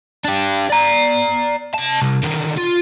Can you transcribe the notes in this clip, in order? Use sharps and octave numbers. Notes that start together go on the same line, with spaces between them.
D4 G4
D5 A#5
C3 A5
C2
D3 D#3
F4